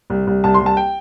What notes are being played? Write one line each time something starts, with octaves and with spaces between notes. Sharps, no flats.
C2
C2
C2 A5
C6
C2
A5
G5